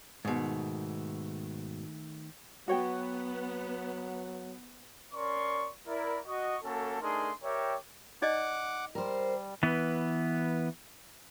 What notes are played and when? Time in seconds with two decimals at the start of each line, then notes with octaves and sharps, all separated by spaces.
0.25 G#2 B2 D#3 A3
2.68 F#3 B3 F#4 C#5 F#5 G5
5.14 C#4 A#4 D5 C6 C#6
5.87 E4 A#4 D5
6.26 F#4 D#5 C#6
6.63 A#3 C#4 F#4 A4
7.01 A3 D4 D#4 G#4 A#4 C6
7.43 G4 A#4 C#5 D5 E5 G5
8.22 D#4 D5 D#5 F#5 D6
8.95 G3 A#4 C5
9.63 E3 B3